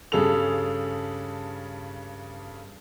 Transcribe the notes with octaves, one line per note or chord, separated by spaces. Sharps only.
G2 C#3 G#4 A4 F7